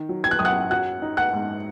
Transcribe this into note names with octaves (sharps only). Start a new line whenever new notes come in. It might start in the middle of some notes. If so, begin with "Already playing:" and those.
Already playing: D#3
F#3
G#6
F#6
F#2 D#6
F#5 F#6
F#3 F#5 F#6
D#4
F#5 F#6
G#2